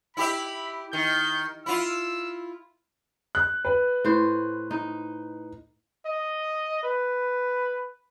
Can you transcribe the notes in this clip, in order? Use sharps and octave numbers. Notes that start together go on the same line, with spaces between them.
E4 G4 E5 B5
D#3 G6
E4 F4 E6
F#6
B4
A2 C5
D#4
D#5
B4